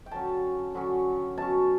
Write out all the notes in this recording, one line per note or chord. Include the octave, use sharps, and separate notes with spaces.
G5
D3 F#3 C#4 A5
D3 F#3 C#4
B2 F#3 C#4 A5